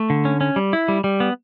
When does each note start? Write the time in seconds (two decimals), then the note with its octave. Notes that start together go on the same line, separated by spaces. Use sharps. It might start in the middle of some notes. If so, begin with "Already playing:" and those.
Already playing: A3
0.10 D3
0.25 C#4
0.41 C#4
0.56 G3
0.73 E4
0.88 G3
1.04 G3
1.20 B3